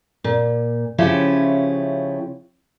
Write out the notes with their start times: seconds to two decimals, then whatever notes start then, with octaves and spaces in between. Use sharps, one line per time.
0.24 A#2
0.98 C#3 F3 C#4 E4 G4